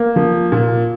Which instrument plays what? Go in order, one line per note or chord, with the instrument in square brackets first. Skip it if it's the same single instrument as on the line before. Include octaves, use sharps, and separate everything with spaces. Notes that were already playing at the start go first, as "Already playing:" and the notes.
Already playing: [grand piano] A#3
F3
A#2